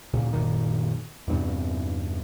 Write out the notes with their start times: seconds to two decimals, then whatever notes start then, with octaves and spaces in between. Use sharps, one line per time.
0.13 D2 A#2 C#3
0.33 F#1 A#2 D#3
1.28 E2 G2 C3